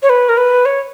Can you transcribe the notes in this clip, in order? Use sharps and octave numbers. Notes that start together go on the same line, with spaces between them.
C#5
B4
A#4
B4
C#5